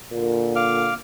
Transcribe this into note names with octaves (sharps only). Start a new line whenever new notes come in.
A#2 D3
F5 D6 F6